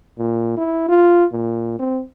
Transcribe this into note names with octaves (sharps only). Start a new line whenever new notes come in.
A#2
E4
F4
A#2
C4